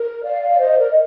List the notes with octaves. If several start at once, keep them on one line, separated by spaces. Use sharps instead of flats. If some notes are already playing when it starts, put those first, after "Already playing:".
Already playing: A#4
D5 F5
D5
C5 D#5
A#4 D5
D#5